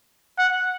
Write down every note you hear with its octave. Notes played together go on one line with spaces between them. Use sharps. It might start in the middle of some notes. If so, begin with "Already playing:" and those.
F#5